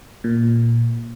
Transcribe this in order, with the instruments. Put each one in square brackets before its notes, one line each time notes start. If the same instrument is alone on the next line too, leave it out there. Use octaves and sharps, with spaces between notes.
[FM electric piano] A#2